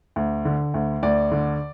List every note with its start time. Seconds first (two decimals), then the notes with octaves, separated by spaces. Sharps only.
0.16 D2
0.45 D3
0.74 D2
1.03 D2 D5
1.32 D3